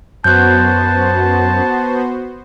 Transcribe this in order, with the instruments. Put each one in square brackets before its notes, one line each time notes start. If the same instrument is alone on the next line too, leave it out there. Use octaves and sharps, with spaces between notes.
[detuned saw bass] F#2 [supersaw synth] B3 F#4 C5 [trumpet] A5 [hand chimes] F#6 G6